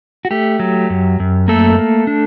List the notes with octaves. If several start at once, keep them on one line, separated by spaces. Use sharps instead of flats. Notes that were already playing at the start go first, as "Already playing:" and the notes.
F#4
A3 G4
F#3
F#2
F#2
A3 A#3 A4
A#3
D4